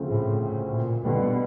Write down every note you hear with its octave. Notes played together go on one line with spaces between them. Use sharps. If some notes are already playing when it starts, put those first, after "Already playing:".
Already playing: D2 C#3 F3 A3 C4
A2
A2
A#2
B2 D3 G3 B3